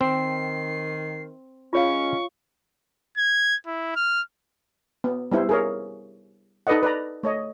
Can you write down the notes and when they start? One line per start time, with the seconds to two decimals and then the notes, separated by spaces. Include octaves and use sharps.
0.01 D#3 C4 C7
1.73 G#3 C#4 F4 C#5 F5 C#6
3.18 G#6
3.67 E4
3.96 F6
5.04 B3
5.32 G3 B3 E4 C5
5.49 G#4 A#4 C#5
6.67 D#4 A4 B4 D5 D#5 F#5
6.83 B4 D5 A#5
7.23 A3 C#5 D#5